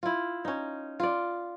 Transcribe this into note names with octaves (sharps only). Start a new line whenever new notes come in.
E4 F4
C#4 D#4
F4 D5